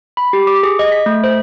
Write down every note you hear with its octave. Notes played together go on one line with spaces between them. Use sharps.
B5
G4
D6
G#4
D#5
B6
A3
C5